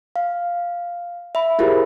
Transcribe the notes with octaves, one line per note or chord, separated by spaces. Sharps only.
F5
E5 B5
E4 F4 G4 G#4 A#4 C5